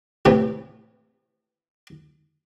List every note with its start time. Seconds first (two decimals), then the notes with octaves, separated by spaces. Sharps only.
0.25 A2 C3 E3